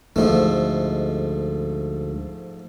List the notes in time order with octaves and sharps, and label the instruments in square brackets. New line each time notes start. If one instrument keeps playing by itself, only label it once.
[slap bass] D2 G#3 [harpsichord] G#2 F3 A3